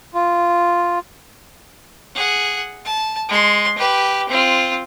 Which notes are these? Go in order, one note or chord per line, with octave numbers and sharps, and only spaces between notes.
F4
G#4 F#5
A5
G#3 C6
G4 B4
C4 F4